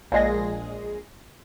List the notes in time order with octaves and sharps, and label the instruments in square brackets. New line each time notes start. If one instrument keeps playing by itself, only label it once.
[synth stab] A#1 A#2 G#3 G#4 A#6